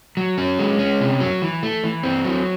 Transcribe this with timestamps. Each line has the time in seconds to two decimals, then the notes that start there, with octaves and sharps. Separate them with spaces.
0.17 F#3
0.38 C#4
0.59 G#3
0.79 C#4
1.01 C3
1.20 F#3
1.42 E3
1.63 A3
1.84 E3
2.03 C4
2.24 F#3